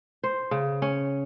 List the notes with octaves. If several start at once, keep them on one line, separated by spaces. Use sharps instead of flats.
C5
C#3
C#4